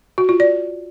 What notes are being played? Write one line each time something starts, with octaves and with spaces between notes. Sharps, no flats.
F#4
F4
D5